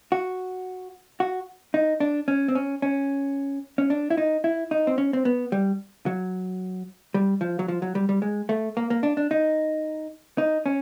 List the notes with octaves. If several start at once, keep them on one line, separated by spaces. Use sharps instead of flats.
F#4
F#4
D#4
D4
C#4
C4
C#4
C#4
C#4
D4
E4
D#4
E4
D#4
C4
C#4
C4
B3
G3
F#3
G3
F3
F#3
F3
F#3
G3
G3
G#3
A3
A#3
A#3
D4
D4
D#4
D#4
C#4